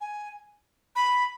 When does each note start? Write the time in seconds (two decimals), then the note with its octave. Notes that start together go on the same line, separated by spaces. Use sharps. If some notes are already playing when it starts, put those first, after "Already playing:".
0.01 G#5
0.96 B5